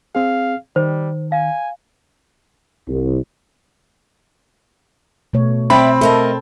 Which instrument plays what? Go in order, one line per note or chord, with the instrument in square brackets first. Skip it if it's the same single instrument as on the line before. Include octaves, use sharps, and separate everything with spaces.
[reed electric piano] C4 G#4 [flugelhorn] F5
[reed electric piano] D#3 [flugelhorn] G3 [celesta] C5
[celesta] F5 [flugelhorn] G#5
[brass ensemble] C2
[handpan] B2 A3 C#5
[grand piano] C4 [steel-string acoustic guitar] D5 E5 G5 [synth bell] B5
[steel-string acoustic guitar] A3 A#4 D#5 [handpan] A4